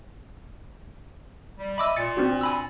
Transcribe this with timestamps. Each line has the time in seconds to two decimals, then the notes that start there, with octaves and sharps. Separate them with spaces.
1.57 G3
1.78 D#5 E5 B5 D6 E6
1.96 A#2 A6 C#7
2.17 C4 D4 F#4
2.41 G#5 B5 E6